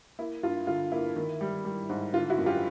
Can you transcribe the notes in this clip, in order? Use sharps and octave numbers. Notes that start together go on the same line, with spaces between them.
A#3 E4
G2 F4
D3 F4
A#3 E4
D#3
G3
G3
G#2
D3 F4
E4 F#4
F#2
F4 G4